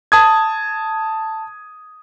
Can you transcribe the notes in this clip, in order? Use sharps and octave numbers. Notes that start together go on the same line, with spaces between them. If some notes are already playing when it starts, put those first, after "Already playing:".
A5 D#6 G#6